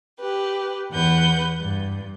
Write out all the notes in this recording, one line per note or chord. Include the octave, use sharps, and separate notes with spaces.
G4 B4
E2 B4 F#5 G6
G2